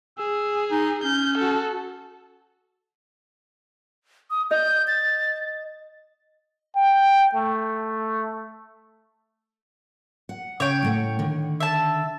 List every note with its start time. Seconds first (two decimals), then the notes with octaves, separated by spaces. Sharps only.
0.18 G#4 E6
0.71 D#4
1.04 C#4 G6
1.38 F#4 A4
4.31 D#6
4.51 D#5 G6
4.88 A6
6.76 G5
7.35 A3
10.29 F#5
10.60 C#3 C#5 G5
10.83 A2 A3 F#5
11.19 D3 D#3
11.60 E5 A5